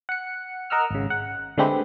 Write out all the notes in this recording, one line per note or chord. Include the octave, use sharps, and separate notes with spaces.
F#5 C#7
A#4 D#5 F#5 E6 F6
G#1 C#3
F#5
D3 G#3 A3 C4 G4 B4